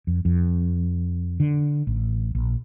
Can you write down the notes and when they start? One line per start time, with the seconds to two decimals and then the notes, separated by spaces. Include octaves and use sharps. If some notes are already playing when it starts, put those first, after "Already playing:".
0.07 F2
0.25 F2
1.40 D3
1.87 A1
2.35 A#1